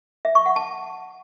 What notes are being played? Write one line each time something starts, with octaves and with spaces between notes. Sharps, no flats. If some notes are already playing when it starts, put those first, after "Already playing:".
E5
C#6
F#5
A5